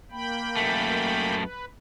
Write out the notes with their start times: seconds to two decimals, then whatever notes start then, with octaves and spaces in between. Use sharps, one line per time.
0.11 A#3 G5 B5
0.57 F#2 A3
1.38 B4